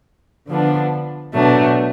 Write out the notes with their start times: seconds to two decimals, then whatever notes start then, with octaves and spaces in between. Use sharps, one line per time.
0.47 D3 F3 B3 D4
1.33 B2 F#3 A3 D4